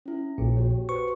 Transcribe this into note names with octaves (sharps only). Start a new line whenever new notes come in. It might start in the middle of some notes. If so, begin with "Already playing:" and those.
C#4 E4
A#1 A#2
F#4 G4 C#5
F#4 B4 C5 C#6